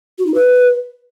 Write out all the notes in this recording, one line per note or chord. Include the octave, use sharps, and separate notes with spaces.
F#4
D#4
B4